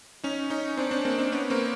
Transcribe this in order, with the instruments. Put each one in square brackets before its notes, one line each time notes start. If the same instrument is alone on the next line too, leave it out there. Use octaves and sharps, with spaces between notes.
[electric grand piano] C#4 D#4
C#4 D#4
C4 D4
C4 D4
A#3 C4
C4 D4
B3 C#4
A#3 C4